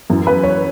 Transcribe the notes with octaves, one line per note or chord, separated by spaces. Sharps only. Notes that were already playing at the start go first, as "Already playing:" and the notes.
F#2 E3
B4
C#5